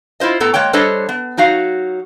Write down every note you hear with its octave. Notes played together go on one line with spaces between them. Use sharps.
E4 F4 C5 D#5
A2 B3 A4 A#5
G#3 A#3 C#5 G5
G3 D4 A4 C5 C#5 D#5
B3
F#3 D#4 F#4 F5